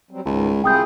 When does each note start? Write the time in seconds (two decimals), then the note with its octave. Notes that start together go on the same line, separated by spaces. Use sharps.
0.11 F#3 G3 C4
0.26 C#2 G#2 D#3
0.64 C2 E4 F4 G#4 G5 D#6 G6